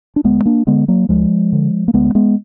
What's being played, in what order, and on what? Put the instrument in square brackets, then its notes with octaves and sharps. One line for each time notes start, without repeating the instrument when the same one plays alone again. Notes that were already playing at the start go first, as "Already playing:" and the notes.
[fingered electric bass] D4
D2 G#3 B3
A#3 D4
D3 G#3 B3
F#3 A#3
D2 F3 G#3
D3
A#3
D2 G#3 B3
G#3 B3